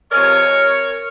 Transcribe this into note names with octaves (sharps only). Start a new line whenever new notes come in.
C3 F3 G#3 A#4 C#5